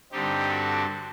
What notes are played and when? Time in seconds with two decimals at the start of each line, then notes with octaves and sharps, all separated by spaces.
0.12 G2 D3 G3 C4 D#4 G4
0.49 F#4 A4